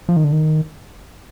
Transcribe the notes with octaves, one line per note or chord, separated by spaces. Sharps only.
F3
D#3
D3
D#3